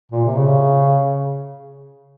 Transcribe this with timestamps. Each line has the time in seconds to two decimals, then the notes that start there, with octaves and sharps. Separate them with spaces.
0.11 A#2
0.25 C3
0.37 C#3